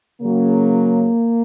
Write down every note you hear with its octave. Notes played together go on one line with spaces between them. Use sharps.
C#3 F#3 A#3